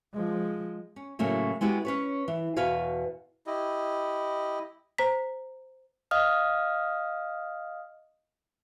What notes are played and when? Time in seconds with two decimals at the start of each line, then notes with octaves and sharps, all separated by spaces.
0.13 F3 G#3
0.96 C#4
1.19 A2 C#3 F#3 A3 A#3
1.61 G#3 B3 E4 F#4 G4
1.85 C#4 B4 C#5
2.28 E3
2.56 E2 B2 F#4 B4 F5 G#5
3.47 E4 G4 D#5
4.98 C5 A#5 B6
6.11 D#5 F5 D#6 F6